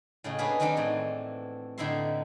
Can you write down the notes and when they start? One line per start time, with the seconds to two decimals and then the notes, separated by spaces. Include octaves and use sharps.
0.24 A2 C#3 G#3
0.38 A#3 B3 C#4 D4 G#4 B4
0.60 D#3 F#3 B3 C4 D4 D#4
0.77 A2 E3
1.78 A2 D3 D#4 E4 E5 C6